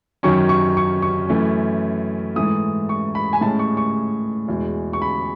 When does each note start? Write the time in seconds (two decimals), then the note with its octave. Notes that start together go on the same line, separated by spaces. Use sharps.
0.23 F#2 D#3 F#3 C#4 C#6
0.49 C#6
0.77 C#6
1.02 C#6
1.29 F#2 E3 A3 C#4
2.36 G#2 E3 A3 D#6
2.89 C#6
3.15 B5
3.33 G#5
3.41 A2 G#3 C#4 A5
3.59 C#6
3.77 C#6
4.48 E2 B2 G#3
4.93 C#6
5.02 B5